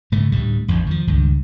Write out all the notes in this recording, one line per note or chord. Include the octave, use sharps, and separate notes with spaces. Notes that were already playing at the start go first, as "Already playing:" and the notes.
G#2 C#3 A3
D2 A2 G3
A1 E2 A2
D#3 F3
C#2 G2 D#3